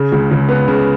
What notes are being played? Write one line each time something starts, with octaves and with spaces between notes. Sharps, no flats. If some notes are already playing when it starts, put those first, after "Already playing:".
Already playing: C#3
C#2
C#2
B3
C#3